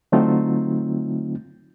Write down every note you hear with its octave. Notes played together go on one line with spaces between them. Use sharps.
D3 F#3 A3 C4 D#4 F4